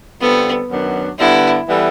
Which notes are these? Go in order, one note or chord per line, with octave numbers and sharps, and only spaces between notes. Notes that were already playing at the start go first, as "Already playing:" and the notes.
D3 G3 B3 C4 F4 A4
F#2 D#3 F#3 B3 D4
D3 G3 B3 E4
E3 G3 B3 E4 A4